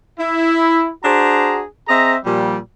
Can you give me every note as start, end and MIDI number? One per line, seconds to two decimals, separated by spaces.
0.20 0.89 64
1.04 1.63 62
1.04 1.63 66
1.04 1.63 68
1.04 1.63 72
1.04 1.63 82
1.88 2.16 60
1.88 2.16 68
1.88 2.16 75
1.88 2.16 76
1.88 2.16 82
2.25 2.58 46
2.25 2.58 53
2.25 2.58 55